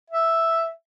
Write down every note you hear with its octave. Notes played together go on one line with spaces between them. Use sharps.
E5